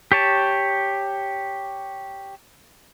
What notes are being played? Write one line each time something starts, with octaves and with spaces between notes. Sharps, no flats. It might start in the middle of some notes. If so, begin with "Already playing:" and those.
G4 C#5 A5